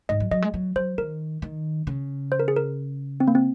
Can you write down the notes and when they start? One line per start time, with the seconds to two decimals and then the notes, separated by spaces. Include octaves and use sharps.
0.09 G#2 D#5
0.20 F#3
0.31 F#3 D#5
0.42 G#3
0.54 F#3
0.76 F#3 C5
0.98 D#3 A#4
1.42 D#3
1.87 C#3
2.32 C5
2.40 A#4
2.48 G#4
2.56 A#4
3.20 C4
3.28 A#3
3.35 C4